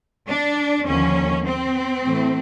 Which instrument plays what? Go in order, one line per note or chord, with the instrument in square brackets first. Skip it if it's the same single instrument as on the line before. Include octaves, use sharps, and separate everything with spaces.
[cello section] D4
D#2 D3 F3 A#3 C#4
C4
A2 E3 A3